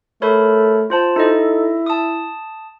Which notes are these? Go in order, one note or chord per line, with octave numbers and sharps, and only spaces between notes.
A3 A#4 C#5 B5
F4 C5 A5
D#4 E4 A4 D#5
A5 D#6